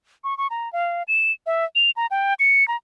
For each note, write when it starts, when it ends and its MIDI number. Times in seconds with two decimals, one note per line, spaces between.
0.24 0.37 85
0.38 0.47 85
0.50 0.71 82
0.73 1.03 77
1.08 1.32 100
1.46 1.65 76
1.75 1.91 101
1.96 2.07 82
2.11 2.34 79
2.40 2.66 97
2.68 2.76 82